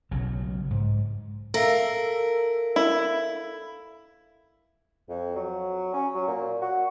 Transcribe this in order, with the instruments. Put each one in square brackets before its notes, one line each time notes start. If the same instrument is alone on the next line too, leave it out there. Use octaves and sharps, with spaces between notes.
[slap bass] B1 C#3 F#3
G#2
[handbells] A4 E5 F5 [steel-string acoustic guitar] A#4
[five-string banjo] E4
[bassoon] F2
F#3
C#4
F#3
A#2
F#4